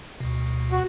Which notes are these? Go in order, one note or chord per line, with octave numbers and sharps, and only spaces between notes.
D2 B2
F#4